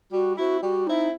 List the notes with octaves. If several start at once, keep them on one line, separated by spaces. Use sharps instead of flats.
G3 F#4
C4 E4 F#4
G3 F#4
C4 D#4 E4